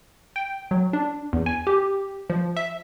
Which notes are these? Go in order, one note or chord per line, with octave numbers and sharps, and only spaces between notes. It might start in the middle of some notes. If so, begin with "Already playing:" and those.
G5
F#3
D4
E2
G#5
G4
F3
E5